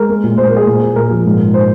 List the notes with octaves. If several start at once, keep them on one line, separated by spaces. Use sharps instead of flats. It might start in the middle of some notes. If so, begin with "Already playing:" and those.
Already playing: G#3 A#4
A#3
A#2
A#2 C5
A#4
A#3 G#4
A#2
A#3
A#2 A#4
F3
G#2
A#3
C5